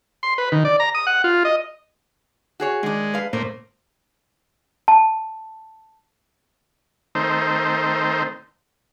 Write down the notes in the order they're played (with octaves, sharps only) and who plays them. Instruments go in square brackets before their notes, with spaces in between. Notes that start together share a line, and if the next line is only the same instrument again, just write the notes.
[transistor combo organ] C6
B4
D#3
D5
A#5
D#6
F#5
F4
D#5
[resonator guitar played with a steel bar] F#4 G#4 C#5
[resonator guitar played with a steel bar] D#3 D4 [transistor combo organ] G#3
[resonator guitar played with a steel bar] B4 F5
[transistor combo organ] A2 A#3 [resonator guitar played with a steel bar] C5
[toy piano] A5
[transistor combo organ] D#3 A3 C4 D#4 C5